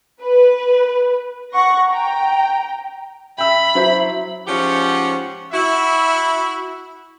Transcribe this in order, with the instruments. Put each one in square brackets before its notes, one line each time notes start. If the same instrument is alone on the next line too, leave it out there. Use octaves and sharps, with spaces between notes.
[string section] B4
F#5 C#6 A#6
G5 A#5
[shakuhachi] E5 [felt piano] G5 E6 [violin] B5
[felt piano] F#3 E4 C5
[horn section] G#2 F3 C#4 G4 F#5
E4 F#4 E5